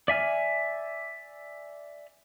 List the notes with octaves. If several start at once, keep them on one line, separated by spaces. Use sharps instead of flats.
D5 E5 G#5 F6